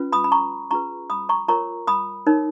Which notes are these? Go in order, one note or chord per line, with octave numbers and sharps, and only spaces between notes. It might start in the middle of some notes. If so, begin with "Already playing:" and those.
Already playing: C#4 F4 B4
B5 D#6
B5
A#5 C#6
C#4 F4 G#4 B4 A#5 C#6
B5 D#6
A#5 C#6
F4 A#4 C#5 A#5 C#6
B5 D#6
D#4 A#4 C#5